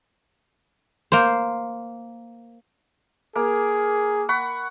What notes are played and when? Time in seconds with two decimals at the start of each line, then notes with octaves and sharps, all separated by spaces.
1.12 A#3 C5
3.36 A#3 G#4
4.29 F#5 B5 C#6